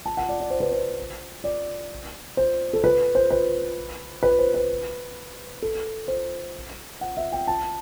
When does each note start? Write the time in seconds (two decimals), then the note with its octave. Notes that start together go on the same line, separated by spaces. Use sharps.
0.06 A5
0.17 F#5
0.29 D5
0.40 D5
0.50 C5
0.60 B4
0.72 C5
1.44 D5
2.37 C5
2.73 A4
2.84 B4
3.15 C5
3.30 B4
4.23 B4
4.39 C5
4.54 B4
5.62 A4
6.08 C5
7.01 F#5
7.17 E5
7.32 G5
7.47 A5